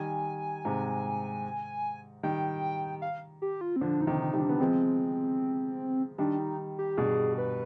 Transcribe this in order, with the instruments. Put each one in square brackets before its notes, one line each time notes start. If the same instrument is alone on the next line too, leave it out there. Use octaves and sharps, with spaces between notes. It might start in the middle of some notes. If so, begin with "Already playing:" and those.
Already playing: [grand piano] D#3 G3 [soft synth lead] G#5
[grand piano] G#2 C3
[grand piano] D#3 G3 [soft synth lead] G5
[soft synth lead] F5
G4
F4
C4
[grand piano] D3 F3 [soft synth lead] D4
[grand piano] D3 [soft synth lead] D#4
[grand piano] C3 D#3
[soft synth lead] D#4
[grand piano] D#3 G3
[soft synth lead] D4
[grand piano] B3
[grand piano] F3 G#3 [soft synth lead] C4
[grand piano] D#3 G3 [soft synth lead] D4
[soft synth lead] D#4
G4
[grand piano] G2 B2 [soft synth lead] G#4
[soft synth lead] B4